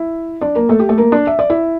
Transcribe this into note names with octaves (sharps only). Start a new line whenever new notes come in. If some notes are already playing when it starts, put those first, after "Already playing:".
Already playing: E4 E5
D4 D5
A#3 A#4
A3 A4
G4
A3 A4
A#3 A#4
D4 D5
E5
D5
E4 E5